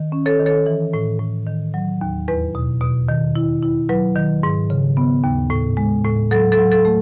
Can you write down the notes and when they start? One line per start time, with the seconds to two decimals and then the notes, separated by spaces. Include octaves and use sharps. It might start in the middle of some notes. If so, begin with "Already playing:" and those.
Already playing: D#3
0.12 C#4
0.26 A4 C#5
0.39 D#3
0.46 A4 C#5
0.66 E3
0.94 A2
1.19 A2
1.47 D#3
1.74 F#3
2.01 D#2
2.28 E2 B4
2.55 B2
2.81 B2
3.08 D#3
3.36 E4
3.63 E4
3.89 F#3 B4
4.16 D#3
4.43 G#2
4.70 C#3
4.97 B3
5.24 D#2
5.50 A2
5.77 G#3
6.04 A2
6.31 F#3 A4
6.52 A4
6.59 F#3
6.72 A4
6.85 A3